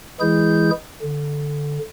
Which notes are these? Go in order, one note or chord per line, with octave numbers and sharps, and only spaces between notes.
E3 G#3 E4 G#4 G6
D3